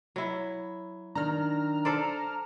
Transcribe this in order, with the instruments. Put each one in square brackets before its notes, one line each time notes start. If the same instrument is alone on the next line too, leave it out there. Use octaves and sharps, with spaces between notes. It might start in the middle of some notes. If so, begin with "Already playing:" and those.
[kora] F#3 E4
[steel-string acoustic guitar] D#3 D4 [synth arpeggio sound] A#5 F6
[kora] A4 C5 D5